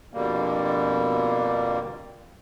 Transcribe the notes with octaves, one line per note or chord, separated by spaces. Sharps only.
F2 B2 D3 G3 A#3